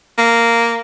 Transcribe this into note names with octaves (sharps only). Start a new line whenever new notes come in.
A#3